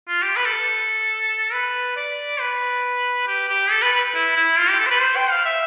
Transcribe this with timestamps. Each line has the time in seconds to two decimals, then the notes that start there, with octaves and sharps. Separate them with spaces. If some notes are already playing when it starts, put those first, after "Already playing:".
0.09 F4
0.22 G4
0.36 B4
0.45 A4
1.53 B4
1.97 D5
2.40 B4
3.27 G4
3.49 G4
3.71 A4
3.82 B4
3.92 B4
4.14 E4
4.36 E4
4.58 F4
4.69 G4
4.79 A4
4.87 C5
4.90 B4
5.02 C5
5.16 G5
5.30 F5
5.45 E5